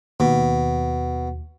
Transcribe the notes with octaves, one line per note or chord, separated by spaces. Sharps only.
D#2 B2